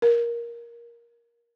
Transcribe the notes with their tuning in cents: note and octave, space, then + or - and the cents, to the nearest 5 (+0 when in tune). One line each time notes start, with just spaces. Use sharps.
A#4 +10